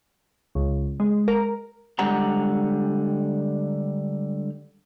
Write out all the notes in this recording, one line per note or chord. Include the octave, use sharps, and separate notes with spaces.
C#2
G#3
A#4
D3 G3 G#3 G4 F#5 A#5